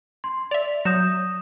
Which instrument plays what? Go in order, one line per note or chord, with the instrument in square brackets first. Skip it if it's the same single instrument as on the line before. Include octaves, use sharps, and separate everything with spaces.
[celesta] C6
[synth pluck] D5 E5 [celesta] F7
[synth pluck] F#3 E7 [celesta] D#6 G6 A#6